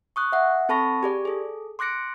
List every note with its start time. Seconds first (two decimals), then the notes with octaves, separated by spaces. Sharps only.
0.16 C#6 D#6 F#6
0.32 E5 F#5
0.69 C4 A4 A5 B5 C#6 A#6
1.03 G4 G#4 D5
1.25 G#4 A4
1.79 C6 D6 F#6 A#6 C#7 D7